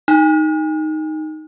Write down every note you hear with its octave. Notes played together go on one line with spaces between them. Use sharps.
D#4